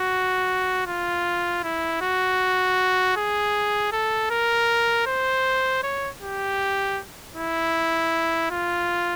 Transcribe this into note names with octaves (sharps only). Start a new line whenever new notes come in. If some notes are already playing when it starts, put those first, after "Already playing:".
Already playing: F#4
F4
E4
F#4
G#4
A4
A#4
C5
C#5
G4
E4
F4